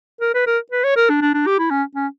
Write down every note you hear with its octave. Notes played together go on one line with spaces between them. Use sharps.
A#4
B4
A#4
B4
C#5
A#4
D4
D4
D4
G4
E4
C#4
C#4